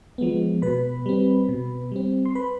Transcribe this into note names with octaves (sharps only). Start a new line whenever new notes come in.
F3 G#3 B3
B2 B4 B5
G3 C4
B2
G3 C4
C6
B4 B5